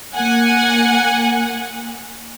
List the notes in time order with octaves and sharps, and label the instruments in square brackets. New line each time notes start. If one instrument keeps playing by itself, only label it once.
[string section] A#3 F#5 G#5